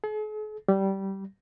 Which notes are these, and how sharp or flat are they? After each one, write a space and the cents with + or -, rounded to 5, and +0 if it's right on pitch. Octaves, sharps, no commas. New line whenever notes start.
G#4 +45
G3 -15